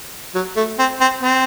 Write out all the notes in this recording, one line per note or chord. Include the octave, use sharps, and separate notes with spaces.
F#3
A3
C4
C4
C4